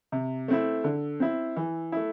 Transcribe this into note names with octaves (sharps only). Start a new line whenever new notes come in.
C3
A3 C4 E4
D3
C4 E4
E3
A3 E4